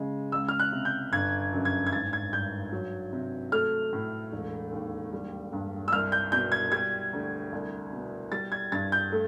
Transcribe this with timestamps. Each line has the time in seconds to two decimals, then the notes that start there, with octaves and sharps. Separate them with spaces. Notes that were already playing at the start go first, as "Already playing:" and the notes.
Already playing: C#3 G#3
0.32 C#2 E6
0.49 F6
0.60 F#6
0.72 C3
0.85 G6
1.12 G1 G#6
1.53 F#2
1.65 G#6
1.87 G#6
1.93 G#1 A6
2.13 G#6
2.33 G2 G6
2.72 F#3
3.13 C3
3.52 A3 F6
3.93 A2
4.32 E1
4.72 D#2
5.13 G3
5.53 G2
5.88 E6
5.92 C2 F6
6.12 G6
6.32 B2 G6
6.52 G#6
6.72 G3 G#6
7.13 D2
7.52 C2
7.93 B2
8.32 G3 A6
8.52 G#6
8.72 G2 A6
8.92 G6
9.12 A3